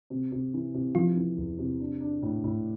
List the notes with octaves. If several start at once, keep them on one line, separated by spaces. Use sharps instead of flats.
C3
C3
E3
C3
E3 F3 F4
E3
E2
C3
D4
D4
A2
A2